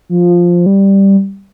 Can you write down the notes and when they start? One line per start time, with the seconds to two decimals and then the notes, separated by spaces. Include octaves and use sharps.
0.09 F3
0.66 G3